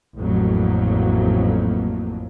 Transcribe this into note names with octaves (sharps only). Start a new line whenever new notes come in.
A1 F2 F#3 A#3